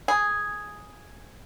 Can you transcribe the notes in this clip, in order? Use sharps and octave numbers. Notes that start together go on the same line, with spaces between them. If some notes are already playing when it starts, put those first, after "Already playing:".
G#4